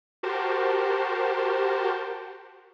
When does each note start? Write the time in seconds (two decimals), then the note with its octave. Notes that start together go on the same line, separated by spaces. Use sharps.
0.23 F#4 G4 A#4 C5 A5